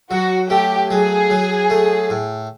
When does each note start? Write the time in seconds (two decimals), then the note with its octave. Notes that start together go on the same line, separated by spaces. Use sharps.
0.10 F#3 F#4
0.50 A3 G4
0.90 F#3 G#4
1.30 F#3
1.70 A3
2.10 A2